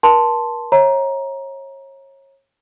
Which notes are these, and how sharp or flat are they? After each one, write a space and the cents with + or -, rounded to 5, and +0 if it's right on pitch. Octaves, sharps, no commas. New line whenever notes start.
A#4 +40 A5 +0 C6 +0
C#5 -30 E5 -35 A#5 +15